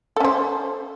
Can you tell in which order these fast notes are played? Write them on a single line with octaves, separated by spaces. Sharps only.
A4 C#4 C5